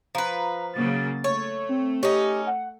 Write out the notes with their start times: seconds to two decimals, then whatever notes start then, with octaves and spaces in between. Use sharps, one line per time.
0.15 F3 B4 A#5
0.74 C#3 F#3 A#3 A6
1.24 A3 C#5
1.69 C4
2.03 C#4 D#4 G4
2.47 F#5